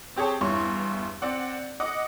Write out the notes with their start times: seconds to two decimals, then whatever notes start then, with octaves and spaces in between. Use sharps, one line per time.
0.16 C4 G4 G#4 C#5 A5
0.41 E2 G2 E4 C#5 C6 C#6
1.22 C4 D5 F#5
1.80 D#5 F#5 D6